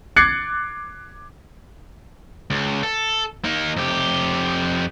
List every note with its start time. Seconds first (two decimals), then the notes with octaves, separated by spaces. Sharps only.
0.16 D6 F#6 G#6 A6 C7 C#7
2.50 C#2
2.83 A4
3.44 A#3 D#4
3.77 F2 G4